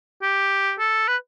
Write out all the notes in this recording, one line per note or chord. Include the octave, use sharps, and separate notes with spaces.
G4
A4
B4